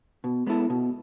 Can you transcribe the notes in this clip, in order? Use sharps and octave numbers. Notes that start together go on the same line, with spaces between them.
B2
G#3 B3 E4 A4
B2